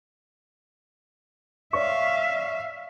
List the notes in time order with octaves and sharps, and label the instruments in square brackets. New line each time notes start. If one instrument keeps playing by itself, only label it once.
[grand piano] C#5 D5 C#6 [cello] E5 F5